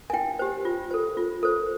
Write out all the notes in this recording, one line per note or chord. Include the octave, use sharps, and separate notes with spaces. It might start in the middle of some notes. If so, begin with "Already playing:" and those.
G#5
E4 G5
G4 C5
F4
A4 C5
F4
A4 C5